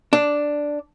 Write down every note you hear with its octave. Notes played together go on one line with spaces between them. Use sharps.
D4